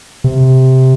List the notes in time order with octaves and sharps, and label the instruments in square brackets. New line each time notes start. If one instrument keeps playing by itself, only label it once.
[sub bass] C3